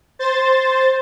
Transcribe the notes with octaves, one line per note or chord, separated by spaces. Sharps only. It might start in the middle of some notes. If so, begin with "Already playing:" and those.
C5 A6